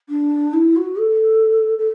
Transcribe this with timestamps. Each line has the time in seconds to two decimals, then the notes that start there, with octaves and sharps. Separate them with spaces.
0.09 D4
0.54 E4
0.76 F#4
0.99 A4
1.78 A4